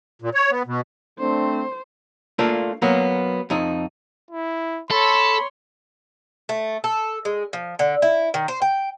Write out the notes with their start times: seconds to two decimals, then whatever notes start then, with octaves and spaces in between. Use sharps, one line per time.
0.22 A#2
0.34 C#5
0.51 B3
0.67 B2
1.20 A3 C4 D4 C5
2.39 A3 A#3 D4 F4
2.82 F#3 A#3 B3
3.50 F2 D#4
4.31 E4
4.91 A4 C#5 B5 C6
6.49 A3
6.84 A4
7.25 G#3
7.53 F3
7.79 D3
8.02 E4
8.34 D#3
8.48 C5
8.62 G5